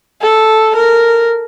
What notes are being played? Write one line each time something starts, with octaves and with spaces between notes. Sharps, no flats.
A4
A#4